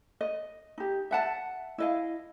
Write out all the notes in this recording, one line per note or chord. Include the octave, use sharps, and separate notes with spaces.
D#5
D#4 G4
E5 F#5 A5
E4 D#5 F5